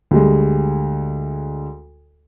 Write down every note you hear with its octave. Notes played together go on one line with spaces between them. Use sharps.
D2 G3 G#3